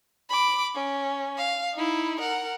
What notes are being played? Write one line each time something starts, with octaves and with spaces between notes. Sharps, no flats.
B5 D6
C#4
F5
D#4 E4
A#4 F#5